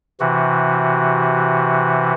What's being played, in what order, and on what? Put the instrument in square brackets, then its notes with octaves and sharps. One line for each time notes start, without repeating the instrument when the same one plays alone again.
[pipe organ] C3 E3 F#4